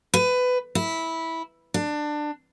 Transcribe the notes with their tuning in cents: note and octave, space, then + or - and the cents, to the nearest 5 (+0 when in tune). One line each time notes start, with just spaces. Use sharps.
B4 +20
E4 -10
D4 +20